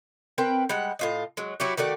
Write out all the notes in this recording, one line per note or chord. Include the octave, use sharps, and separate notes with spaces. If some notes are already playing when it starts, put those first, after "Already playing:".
C4 A#4 B4 G5
G3 G#3 F#5
A2 F4 D#5
F#3 G#3
F#3 E4 F#4 G4
D#3 A3 F#4 D5